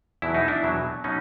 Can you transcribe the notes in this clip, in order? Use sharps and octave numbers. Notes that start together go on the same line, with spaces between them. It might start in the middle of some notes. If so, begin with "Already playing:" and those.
E2 B2 F#3 E4
D#4
D4 E4
E2 B2 F#3
B2 F#3 C#4 D#4